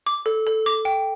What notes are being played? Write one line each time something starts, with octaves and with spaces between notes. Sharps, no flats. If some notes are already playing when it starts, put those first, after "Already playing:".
D6
A4
A4
D6
G5